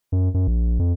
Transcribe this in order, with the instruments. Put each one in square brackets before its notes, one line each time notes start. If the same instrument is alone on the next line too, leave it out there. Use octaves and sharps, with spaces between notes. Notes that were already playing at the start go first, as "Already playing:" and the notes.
[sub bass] F#2
F#2
A#1
F2